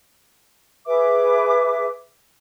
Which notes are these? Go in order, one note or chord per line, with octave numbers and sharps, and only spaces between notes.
G#4 B4 E5 D6